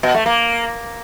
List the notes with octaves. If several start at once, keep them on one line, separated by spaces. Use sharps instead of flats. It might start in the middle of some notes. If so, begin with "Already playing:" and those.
B2
A3
A#3